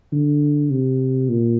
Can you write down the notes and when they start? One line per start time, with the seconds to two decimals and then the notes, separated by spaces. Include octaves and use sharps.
0.12 D3
0.70 C3
1.29 A#2